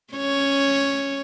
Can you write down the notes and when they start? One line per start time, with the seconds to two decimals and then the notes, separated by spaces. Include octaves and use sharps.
0.14 C#4 C#5